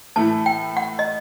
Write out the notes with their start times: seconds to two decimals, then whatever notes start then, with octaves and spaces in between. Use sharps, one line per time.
0.16 A2 E3 A3 E4 A5
0.46 G5
0.77 F#5
0.99 D#5